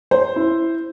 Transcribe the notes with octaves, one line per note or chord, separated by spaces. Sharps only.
C5
E4